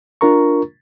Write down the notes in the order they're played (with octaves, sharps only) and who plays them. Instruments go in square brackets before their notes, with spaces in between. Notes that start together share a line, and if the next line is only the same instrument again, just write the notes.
[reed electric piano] D4 F4 A#4 A#5 C#6